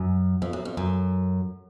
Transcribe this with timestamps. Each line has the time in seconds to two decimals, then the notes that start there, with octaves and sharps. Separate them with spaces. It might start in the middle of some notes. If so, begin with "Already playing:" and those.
Already playing: F#2
0.42 F2
0.53 F#2
0.65 F2
0.77 F#2